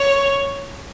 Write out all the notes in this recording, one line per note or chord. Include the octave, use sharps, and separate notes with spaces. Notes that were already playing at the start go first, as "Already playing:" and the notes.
Already playing: C#5